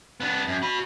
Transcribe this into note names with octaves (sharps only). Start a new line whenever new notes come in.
B3 D4
F#2
F#4 B5